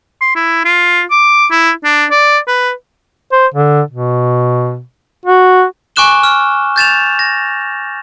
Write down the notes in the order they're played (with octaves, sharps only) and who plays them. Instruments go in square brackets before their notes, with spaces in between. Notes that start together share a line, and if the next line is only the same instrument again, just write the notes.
[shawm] C6
E4
F4
D6
E4
D4
D5
B4
[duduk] C5
D3
B2
F#4
[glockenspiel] G#5 C#6 D6 F#6 E7 G7
F6
G6 A6 E7 F7
A#6